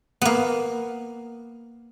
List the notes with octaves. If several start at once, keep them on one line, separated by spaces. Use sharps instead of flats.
A#3 B3